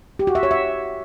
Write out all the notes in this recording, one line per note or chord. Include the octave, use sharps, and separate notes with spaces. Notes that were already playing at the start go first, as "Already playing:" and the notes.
G4
F#4
E5
C#5
E5